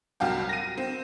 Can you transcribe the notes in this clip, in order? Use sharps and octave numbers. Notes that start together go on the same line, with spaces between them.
C2 F#3 F5 G5
A#6 D#7
C4